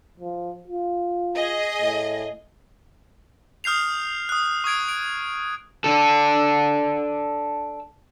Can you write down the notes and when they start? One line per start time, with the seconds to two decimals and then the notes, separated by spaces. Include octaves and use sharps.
0.19 F3
0.68 F4
1.35 G#4 D#5
1.81 A2
3.64 D#6 F6 G6 C7 F7
4.29 D#6 F#6
4.64 C#6 D#6 G#6 D7
4.89 D7
5.84 D4 A4